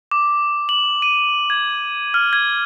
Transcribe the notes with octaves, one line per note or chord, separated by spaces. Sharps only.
D6
F#7
D#7
G#6
F6
G#6